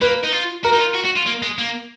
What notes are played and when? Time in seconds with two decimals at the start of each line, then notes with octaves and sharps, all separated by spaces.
0.01 A#3 B4
0.23 D#4
0.32 F4
0.64 F#4 A#4
0.73 D#4
0.79 F4
0.95 F#4
1.05 F#4
1.17 F4
1.27 A#3
1.42 G#3
1.58 A#3